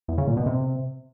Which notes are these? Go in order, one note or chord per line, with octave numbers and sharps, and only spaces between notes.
E2
C#3
A#2
B2
C3